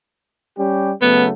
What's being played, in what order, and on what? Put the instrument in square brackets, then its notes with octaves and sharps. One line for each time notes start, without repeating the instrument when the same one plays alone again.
[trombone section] G3 C#4 G4
[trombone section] C#3 F#3 A3 [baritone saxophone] B3